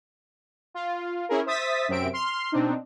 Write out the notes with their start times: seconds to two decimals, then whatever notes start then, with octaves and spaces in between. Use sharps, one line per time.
0.74 F4
1.29 C#4 E4 G#4 A#4
1.45 C5 E5 D#6 A6 B6
1.88 F#2 C3 C4 E5 D7
2.13 C6 F6
2.52 B2 C4 D4 D#4